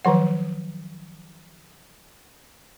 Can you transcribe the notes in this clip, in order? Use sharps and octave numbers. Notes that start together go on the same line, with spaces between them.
D#3 F3 F#3 F#5